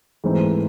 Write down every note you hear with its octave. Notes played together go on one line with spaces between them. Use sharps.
G#2 E3 A3 C4 D#4